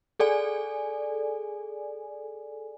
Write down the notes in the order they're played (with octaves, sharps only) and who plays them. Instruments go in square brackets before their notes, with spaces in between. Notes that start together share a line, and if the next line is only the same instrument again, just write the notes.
[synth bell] G#4 A4 D5 G#5